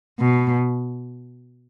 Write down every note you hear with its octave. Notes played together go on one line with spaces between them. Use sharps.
B2